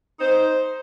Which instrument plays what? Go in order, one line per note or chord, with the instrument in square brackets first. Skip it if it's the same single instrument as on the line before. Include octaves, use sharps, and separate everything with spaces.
[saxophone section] D#4 C5